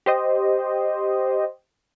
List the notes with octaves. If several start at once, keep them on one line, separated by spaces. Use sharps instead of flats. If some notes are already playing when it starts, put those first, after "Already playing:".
G4 C5 D#5